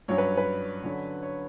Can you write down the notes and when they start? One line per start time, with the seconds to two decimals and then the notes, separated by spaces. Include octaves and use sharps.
0.08 G2 F#3 C#4 C#5
0.18 B4
0.37 B4
0.84 D3 F#3 C#4
1.23 C#5